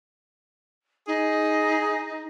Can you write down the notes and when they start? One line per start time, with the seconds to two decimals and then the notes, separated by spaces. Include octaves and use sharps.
1.07 D#4 G#4